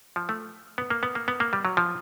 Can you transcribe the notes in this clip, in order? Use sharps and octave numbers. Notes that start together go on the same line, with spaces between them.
F3
A3
B3
A#3
B3
A#3
B3
A#3
G3
F#3
F3